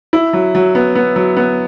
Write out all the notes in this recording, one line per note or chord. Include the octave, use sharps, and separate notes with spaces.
E4
F#3
F#3
B3
B3
F#3
B3